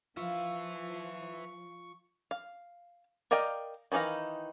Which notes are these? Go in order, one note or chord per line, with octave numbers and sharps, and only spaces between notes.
F3 F4 B4 E5 C#6
F5
A#4 D5 D#5 F5 G5
D#3 E3 D#4 F5 A#5